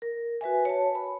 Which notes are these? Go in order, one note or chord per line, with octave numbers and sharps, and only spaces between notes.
A#4
F#4 B4 E5 G#5
C#5 A5
B5